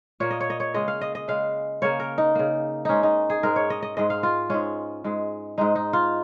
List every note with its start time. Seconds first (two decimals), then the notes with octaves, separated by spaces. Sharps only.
0.20 A#2 A#3 C#5
0.31 D#5
0.40 C#5
0.50 D#5
0.60 C#5
0.74 C#3 G#3 D#5
0.88 F5
1.01 D#5
1.15 D#5
1.28 C#3 G#3 F5
1.82 C#3 A#3 C#5
2.00 A#4
2.18 D#4
2.35 C#3 A#3
2.85 G#2 G#3 C#4 D#4
3.03 D#4
3.30 G#4
3.43 G#2 G#3 A#4
3.56 C#5
3.70 D#5
3.83 D#5
3.97 G#2 G#3 D#5
4.10 F5
4.23 F4
4.50 G#2 G#3 C#4
5.04 G#2 G#3
5.58 G#2 G#3 D#4
5.75 D#4
5.93 F4